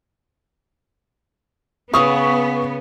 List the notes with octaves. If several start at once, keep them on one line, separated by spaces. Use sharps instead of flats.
C#3 B3 C#5 F5 C#6 D#6